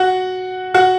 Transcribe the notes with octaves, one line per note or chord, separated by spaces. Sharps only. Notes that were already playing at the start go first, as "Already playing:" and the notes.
Already playing: F#4 F#5
F#4 F#5